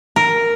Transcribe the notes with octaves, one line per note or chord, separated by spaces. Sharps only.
A#4